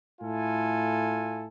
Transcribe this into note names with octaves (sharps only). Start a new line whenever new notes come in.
A2 E4 F4 A4 G#5